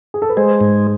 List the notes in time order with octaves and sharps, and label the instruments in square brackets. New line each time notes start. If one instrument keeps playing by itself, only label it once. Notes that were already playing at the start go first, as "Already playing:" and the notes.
[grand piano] G#4
A4
B4
[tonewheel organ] G#3 [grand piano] C5
[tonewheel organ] G#2